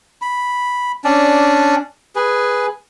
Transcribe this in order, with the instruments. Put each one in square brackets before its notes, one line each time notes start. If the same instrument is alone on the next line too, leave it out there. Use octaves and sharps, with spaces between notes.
[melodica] B5
C#4 D4 D5
G#4 B4